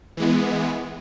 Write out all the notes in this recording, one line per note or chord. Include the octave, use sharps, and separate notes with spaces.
E3 G#3 B3